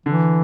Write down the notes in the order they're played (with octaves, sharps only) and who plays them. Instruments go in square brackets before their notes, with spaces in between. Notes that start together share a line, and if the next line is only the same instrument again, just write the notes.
[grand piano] D3 [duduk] E3